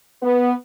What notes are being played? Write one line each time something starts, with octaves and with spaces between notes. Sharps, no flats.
B3